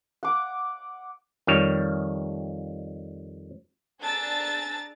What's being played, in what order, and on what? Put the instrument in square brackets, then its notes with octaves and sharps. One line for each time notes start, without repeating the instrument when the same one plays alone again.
[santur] F#5 D6
[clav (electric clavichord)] F2 D#3 G3 C#5
[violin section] D4 G#4 A5 A#5 E6 A6